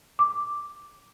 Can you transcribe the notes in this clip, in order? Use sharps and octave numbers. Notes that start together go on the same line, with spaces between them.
D6